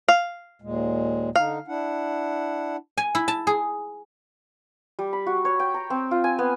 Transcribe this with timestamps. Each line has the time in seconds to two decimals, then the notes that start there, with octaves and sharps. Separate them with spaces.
0.08 F5
0.62 D#2 A#2 G#3
1.36 D3 D#4 F5
1.68 D4 E4 F#5
2.97 G#5
3.15 E4
3.28 A5
3.47 G#4
4.99 G3
5.13 B5
5.27 F#4
5.45 C#5
5.59 G5
5.74 A#5
5.90 C4
6.11 F4
6.24 G#5
6.39 B3